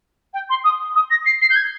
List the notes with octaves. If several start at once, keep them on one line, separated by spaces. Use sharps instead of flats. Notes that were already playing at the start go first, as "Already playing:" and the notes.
G5
C6
D#6
D#6
A#6
C7
C7
G6
G#6